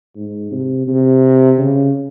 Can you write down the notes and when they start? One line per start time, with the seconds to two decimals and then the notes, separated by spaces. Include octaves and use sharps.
0.16 G#2
0.51 C3
0.87 C3
1.58 C#3